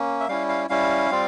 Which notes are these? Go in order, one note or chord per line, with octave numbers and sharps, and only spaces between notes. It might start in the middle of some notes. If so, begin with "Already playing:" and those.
Already playing: A#3 C#4
E5
G3 C#4 E4 F5
F5
G3 C#4 E4 F5
G3 C4 F4